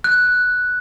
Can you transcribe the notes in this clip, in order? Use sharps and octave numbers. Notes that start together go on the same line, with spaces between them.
F#6